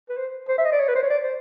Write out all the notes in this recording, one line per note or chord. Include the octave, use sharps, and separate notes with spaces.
B4
C5
C5
E5
D#5
D5
C#5
B4
C5
C#5
D5
C5